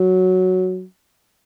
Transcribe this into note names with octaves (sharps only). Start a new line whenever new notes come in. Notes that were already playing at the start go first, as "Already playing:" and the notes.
Already playing: F#3